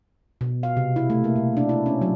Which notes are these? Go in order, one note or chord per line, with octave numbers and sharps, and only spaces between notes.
B2
F5
C3
E4
A3
A#3
B2
D4
E4
C#4
F#3